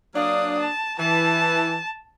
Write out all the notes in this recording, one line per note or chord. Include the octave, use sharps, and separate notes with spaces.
F#3 A#3 D4 F5 D#6
A5
E3 A5